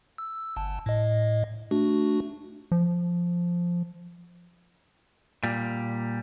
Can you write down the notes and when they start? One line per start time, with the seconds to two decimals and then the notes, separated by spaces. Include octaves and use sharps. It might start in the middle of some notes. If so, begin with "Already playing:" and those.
0.18 E6
0.56 G1 A5
0.86 A2 D#5
1.71 A3 D4 F#4
2.72 F3
5.43 A#2 G3